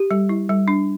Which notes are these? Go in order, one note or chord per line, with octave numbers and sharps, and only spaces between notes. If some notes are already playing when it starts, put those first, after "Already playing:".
Already playing: G4
G3
E4
G3
D4